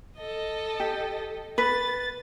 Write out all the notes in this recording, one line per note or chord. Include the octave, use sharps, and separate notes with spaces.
A4 D#5
G4
B4 A6